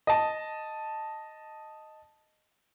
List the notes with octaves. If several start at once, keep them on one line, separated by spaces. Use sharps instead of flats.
D#5 A5